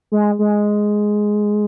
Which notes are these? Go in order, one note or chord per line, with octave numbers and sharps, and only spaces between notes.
G#3
G#3